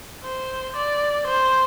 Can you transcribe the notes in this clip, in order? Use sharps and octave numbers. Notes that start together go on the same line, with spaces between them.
C5
D5
C5